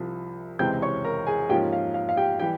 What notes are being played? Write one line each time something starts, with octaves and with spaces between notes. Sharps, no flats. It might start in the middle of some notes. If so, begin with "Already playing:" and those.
Already playing: C2 C3 F3
C#2 C3 E3 G#3 C4 G5 G6
C#5 C#6
A#4 A#5
G#4 G#5
G#2 F3 A#3 C#4 F4 G4 G5
F5
F5
F5
G4 G5
E3 G3 G4 G5